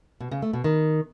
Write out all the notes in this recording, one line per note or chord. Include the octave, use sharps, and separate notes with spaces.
B2
C#3
A3
B2
D#3